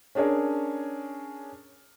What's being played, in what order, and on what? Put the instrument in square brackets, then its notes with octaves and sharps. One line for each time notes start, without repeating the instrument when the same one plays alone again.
[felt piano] C#4 D4 G#4 A#4 C#5